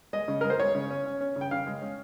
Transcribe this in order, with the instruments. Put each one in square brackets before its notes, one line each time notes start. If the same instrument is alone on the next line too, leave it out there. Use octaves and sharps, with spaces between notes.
[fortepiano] G#3 D#5
C#3
G#3 A#4
C5
G#3 C#5
C#3
C#4
C#4
C#4
C#3
G5
C#3 F5
G#3
C#4